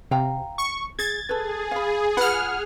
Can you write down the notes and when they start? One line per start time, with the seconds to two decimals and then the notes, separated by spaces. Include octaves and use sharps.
0.11 C3 F5 G5 A#5
0.58 C#6
0.99 G#4 G#6 A6
1.29 G#4 A4 B4
1.71 F5 B5
2.17 F4 B4 F#5 B5 F6